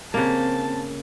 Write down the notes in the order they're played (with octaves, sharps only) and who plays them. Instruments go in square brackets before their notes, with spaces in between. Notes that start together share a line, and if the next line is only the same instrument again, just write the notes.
[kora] C#3 A#3 [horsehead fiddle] C4 A5